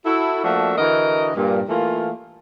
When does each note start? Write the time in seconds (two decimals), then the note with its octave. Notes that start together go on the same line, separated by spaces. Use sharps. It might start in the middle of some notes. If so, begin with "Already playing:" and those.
0.06 E4 F#4 A4
0.44 F3 A3 A#3 D4 F#4 E5
0.78 D3 E3 F#4 A#4 D#5
1.35 G2 A#2
1.69 E3 A3 A#3 F4